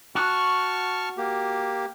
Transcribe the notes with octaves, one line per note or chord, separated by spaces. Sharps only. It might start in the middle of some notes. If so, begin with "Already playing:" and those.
F#4 A5 C#6 F6
A#3 G4